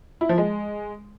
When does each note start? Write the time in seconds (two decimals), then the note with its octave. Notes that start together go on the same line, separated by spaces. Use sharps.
0.21 E4
0.29 F3
0.38 G#3